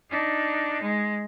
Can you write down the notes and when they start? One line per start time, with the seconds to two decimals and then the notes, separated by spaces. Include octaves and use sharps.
0.10 D4 D#4
0.82 G#3